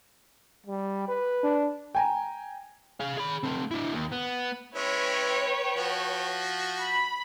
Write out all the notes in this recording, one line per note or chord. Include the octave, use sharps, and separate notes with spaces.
G3
B4
D4
G5 G#5 A#5
G#4 F5
G#4 B5
A3 C4
D4 E4
D#2
B3
G#3 C#4 E4 B4 C#5 G5
F3 F#4
B5